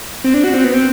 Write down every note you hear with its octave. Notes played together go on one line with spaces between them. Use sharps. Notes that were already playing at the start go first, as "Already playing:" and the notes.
C4
D4
F#4
C4
B3
C4